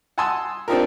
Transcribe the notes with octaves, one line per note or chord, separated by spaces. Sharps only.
F#5 G#5 A5 C6 D#6 E6
C4 D4 D#4 F4 G4 A#4